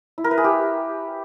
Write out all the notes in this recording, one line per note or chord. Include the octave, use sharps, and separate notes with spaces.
E4
A#4
B4
G#4
G4